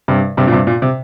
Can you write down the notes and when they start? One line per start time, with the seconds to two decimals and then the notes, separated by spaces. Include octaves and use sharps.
0.08 G2 C3
0.37 G2 C3
0.47 A#2
0.52 G2 C3
0.67 A#2
0.82 C3